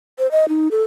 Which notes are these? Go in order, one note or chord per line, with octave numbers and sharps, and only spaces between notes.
C5
D#5
D#4
A4